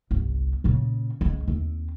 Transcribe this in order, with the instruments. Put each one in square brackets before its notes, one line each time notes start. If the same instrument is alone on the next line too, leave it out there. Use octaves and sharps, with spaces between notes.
[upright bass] G1 C2
A#2 C#3
C#2 G#3
D#2 C4